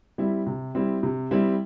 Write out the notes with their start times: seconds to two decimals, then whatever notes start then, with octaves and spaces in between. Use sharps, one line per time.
0.18 G3 C4 E4
0.47 C3
0.75 G3 C4 E4
1.03 C3
1.31 G3 C4 E4